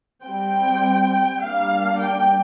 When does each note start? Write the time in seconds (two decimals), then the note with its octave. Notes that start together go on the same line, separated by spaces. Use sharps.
0.25 G3 C4 G5
1.42 G3 A#3 D4 F5
2.00 G5